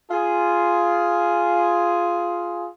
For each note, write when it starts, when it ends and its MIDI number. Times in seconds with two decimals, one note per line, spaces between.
0.11 2.68 65
0.11 2.68 68